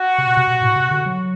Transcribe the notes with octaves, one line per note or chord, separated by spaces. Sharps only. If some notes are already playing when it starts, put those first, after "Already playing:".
Already playing: F#4
C3
B2
C3
B2
A2
C3
D3
F#3